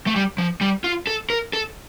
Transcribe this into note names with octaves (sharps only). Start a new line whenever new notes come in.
A3
G3
F3
G3
F4
A4
A#4
A4